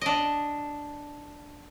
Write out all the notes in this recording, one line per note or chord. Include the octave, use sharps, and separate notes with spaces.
D4 D#5